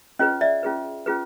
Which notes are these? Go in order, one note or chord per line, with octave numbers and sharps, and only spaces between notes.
C#4 F4 G#4 B4 C#5 D#5
D5 E5
C#4 F4 G#4 B4
C#4 F4 G#4 B4